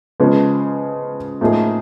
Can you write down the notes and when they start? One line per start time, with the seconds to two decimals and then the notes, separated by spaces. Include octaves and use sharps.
0.20 C#3 F3 G#3 B3
1.41 A2 F3 A#3 D#4 G#4